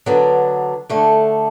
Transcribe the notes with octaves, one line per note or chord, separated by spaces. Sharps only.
D3 F#3 B3 D4
D3 A3 D4